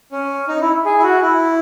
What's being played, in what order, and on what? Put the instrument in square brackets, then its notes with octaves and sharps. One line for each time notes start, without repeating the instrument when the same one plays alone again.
[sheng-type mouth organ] C#4
D#4
E4
G#4
E4
F#4
E4